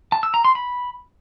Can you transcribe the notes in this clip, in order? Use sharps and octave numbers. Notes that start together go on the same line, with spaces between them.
A5
E6
A#5
C6
B5